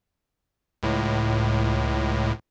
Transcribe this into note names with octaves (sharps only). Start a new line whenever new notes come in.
C#2 A2